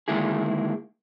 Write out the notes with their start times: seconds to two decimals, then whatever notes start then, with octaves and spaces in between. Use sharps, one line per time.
0.08 D3 D#3 G#3 A#3 E4 G#4